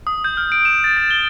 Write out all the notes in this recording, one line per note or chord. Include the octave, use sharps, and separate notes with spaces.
D#6
G6
F6
D7
E7
A6
A6
G7